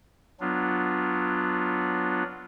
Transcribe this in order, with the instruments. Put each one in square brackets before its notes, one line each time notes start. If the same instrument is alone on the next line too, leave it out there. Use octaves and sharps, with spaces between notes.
[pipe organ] F#3 B3 D4 F4